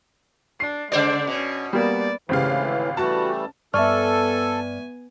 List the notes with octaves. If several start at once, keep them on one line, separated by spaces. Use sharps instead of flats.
D4 C7
C#3 G#3 C5 D5
B2 C#4
G3 A#3 B3 D5
G#1 A2 C#3 E3 G4 C5 F5
E3 G3 A3 F#4 A5
G2 B3 A4 D5 E5 G#5 C#6 F6